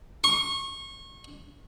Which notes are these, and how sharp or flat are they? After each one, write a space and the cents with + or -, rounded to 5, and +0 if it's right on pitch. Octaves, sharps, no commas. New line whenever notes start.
C#6 -30